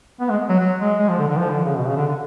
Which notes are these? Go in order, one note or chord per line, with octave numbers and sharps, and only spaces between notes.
B3
G#3
F#3
F#3
G#3
G#3
F3
D3
D3
F3
D3
C#3
B2
C#3
D3
D3